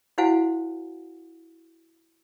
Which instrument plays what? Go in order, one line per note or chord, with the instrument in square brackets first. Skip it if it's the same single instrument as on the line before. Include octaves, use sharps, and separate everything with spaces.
[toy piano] E4 F#4 C5 F5 F#5 G#5